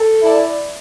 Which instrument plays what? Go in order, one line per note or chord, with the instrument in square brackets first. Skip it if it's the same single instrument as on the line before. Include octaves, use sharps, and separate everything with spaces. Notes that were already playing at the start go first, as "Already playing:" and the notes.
Already playing: [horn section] A4
[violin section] E4 D5 A5